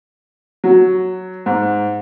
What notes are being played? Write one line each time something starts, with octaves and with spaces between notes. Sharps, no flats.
F#3
G#2